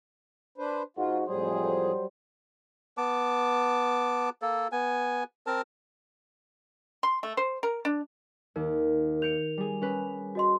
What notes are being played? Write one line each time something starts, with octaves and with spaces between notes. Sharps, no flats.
D4 B4 C5
G#2 F4 F#4
F2 A2 F#3 G3 G#4 C5
B3 A5 D6
A#3 A4
B3 G#5
C4 A#4 A5
C6
A3
C5
A#4
D4
D#2 A#4
G6 C#7 D7 F7
G3 G#4
C#4 B4
F#4 D#5 C6